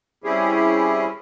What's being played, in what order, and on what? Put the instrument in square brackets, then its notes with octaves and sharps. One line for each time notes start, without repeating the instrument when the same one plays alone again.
[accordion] G3 C4 C#4 E4 G4 G#4